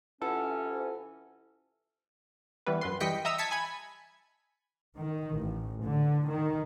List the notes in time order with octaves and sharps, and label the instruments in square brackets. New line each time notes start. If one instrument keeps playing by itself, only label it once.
[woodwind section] C3 E3 C#4 [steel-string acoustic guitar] E4 F4 F#5 [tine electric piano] A4
[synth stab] E3 G3 B3 B4
F#2 B4 C6
E3 G3 D#5 G5 B6 C#7
D#5 E5 A#5 D#6 E6
A5 G#6 B6 C#7
G#5 B5 G#6
[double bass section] D#3
A1
D3
D#3